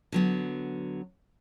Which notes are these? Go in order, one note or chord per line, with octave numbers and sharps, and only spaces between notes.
D3 F#3 B3